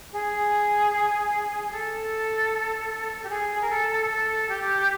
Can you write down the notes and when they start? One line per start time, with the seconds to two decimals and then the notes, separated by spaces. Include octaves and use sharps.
0.12 G#4
1.71 A4
3.23 G4
3.29 G#4
3.61 A#4
3.69 A4
4.09 A4
4.49 G4